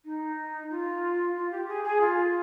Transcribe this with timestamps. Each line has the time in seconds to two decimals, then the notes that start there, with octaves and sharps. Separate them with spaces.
0.05 D#4
0.70 F4
1.35 F4
1.51 G4
1.68 G#4
1.84 G#4
2.01 F4